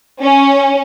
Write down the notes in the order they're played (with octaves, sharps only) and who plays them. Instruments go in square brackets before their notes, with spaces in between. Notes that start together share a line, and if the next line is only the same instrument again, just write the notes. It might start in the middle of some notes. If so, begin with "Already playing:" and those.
[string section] C#4